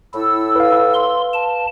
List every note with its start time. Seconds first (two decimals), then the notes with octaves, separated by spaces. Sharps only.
0.14 A2 E4 A4 E6
0.56 B4 F5
0.94 C6
1.33 A5